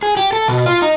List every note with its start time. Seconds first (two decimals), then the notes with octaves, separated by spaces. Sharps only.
0.03 G#4
0.17 G4
0.33 A4
0.48 B2
0.66 F4
0.82 D#4